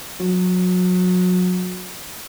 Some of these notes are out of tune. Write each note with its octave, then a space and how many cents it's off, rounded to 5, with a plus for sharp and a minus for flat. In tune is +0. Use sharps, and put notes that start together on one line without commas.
F#3 -30